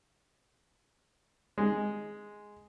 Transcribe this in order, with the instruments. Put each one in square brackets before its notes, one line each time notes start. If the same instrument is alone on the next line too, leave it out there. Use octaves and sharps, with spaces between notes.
[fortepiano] G#3